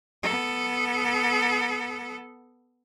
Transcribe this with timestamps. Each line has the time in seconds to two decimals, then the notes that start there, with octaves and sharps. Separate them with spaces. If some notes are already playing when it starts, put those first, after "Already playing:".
0.23 B3 A4